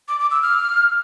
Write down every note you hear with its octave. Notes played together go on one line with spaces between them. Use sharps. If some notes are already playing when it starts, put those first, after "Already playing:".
D6
D6
E6
F6